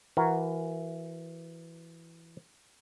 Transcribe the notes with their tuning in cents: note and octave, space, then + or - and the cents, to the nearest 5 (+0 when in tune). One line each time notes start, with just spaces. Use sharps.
E3 +15 F#4 +0 A#4 +0